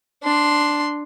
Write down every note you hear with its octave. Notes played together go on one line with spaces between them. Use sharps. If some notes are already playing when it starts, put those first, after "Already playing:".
D4 C6